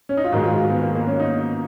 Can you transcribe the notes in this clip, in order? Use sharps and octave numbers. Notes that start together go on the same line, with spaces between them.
C#4
D#4
F4
G#2 D#3 G#3 F#4
F4
F4
B3
A#3
A#3
C#4
D#4